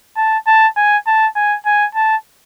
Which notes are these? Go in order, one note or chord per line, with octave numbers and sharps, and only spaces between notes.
A5
A5
G#5
A5
G#5
G#5
A5